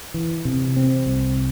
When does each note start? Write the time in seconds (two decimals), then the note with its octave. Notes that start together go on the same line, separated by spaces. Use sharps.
0.14 E3
0.45 C3
0.76 C4
1.06 C2